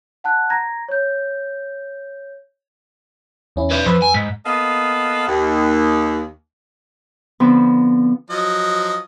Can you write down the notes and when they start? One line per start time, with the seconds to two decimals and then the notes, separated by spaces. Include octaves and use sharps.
0.24 F#5 A5 F#6
0.50 A#5 G#6 A#6
0.89 C#5 G6
3.56 E2 C#4 E4
3.71 B4 D5
3.86 F2 F3 B4 E6
4.02 G#5
4.14 G#2 B6
4.46 A#3 B3 A4 D#5 F5
5.28 D#2
7.40 D3 F3 B3 C4
8.30 F3 F#3 D#5